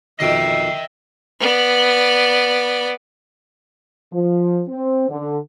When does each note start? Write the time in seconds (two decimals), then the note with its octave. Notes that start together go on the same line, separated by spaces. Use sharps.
0.20 F2 B2 D#3 D#5 E5 G5 C7
1.40 B3 D5
4.13 F3
4.68 C4
5.10 D3